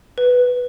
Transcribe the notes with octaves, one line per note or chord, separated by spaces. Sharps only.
B4